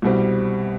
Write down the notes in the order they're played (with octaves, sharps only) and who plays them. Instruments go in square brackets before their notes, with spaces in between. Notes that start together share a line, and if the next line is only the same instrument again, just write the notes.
[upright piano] C2 B2 G3 C4